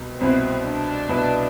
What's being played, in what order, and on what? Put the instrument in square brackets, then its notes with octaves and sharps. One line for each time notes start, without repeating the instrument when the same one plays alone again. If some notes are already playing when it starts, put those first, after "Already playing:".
Already playing: [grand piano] C2 B2 B3
[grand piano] C2 B2 B3 E4 B4 [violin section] C4
[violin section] D4
[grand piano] C2 B2 B3 E4 B4